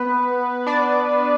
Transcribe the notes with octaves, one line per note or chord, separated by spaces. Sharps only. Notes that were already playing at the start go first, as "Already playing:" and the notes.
Already playing: B3 B4
D4 D5